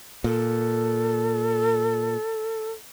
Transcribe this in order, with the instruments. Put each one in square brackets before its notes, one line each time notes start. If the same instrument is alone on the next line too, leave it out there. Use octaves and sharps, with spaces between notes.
[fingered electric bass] A#2 [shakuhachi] A4